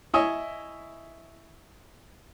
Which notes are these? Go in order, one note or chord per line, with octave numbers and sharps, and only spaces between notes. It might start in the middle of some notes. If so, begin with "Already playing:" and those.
E4 C#5 D#5 E5 G#5